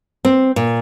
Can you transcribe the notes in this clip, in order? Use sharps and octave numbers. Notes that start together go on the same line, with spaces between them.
C4
A#2